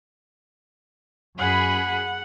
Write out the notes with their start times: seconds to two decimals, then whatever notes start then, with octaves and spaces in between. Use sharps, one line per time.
1.38 F#2 G#4 F#5 B5